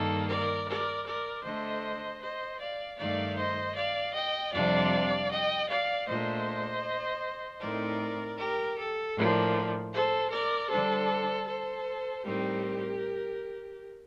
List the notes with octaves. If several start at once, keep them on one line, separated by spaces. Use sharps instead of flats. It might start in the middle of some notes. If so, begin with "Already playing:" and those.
Already playing: G2 D#3 A#3 A4
A#4 D5
A#4 D5
A#4 D5
D3 A3 D4 C5 D#5
C5 D#5
D5 F5
G2 D#3 A3 D#4 D5 F5
C5 D#5
D5 F5
D#5 G5
F2 C3 G3 D4 D5 F5
D#5 G5
D5 F5
A#2 A3 D4 C5 D#5
A2 A3 C4 D#4 A#4 D5
G4 A#4
A4
A2 F3 A#3 D4
A4 C5
A#4 D5
D3 G3 D4 A4 C5
A4 C5
A2 G3 C4 D#4 G4 A#4